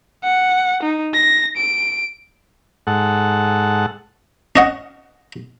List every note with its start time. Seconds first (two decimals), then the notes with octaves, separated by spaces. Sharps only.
0.24 F#5
0.83 D#4
1.14 A#6
1.57 D7
2.87 G#2 A4 F#5
4.56 C#4 D#5 F#5